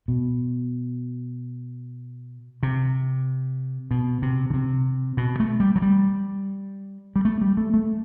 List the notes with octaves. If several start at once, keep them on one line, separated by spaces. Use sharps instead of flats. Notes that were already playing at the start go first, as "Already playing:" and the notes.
B2
C3
B2
C3
D3
C3
B2
A3
G3
F#3
G3
G3
A3
G3
A3
A3